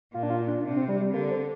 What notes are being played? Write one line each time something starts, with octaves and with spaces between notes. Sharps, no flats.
A#2 F4
D4
F4
D4
C3 D4
C4
G3
G3
D3 A#3
C4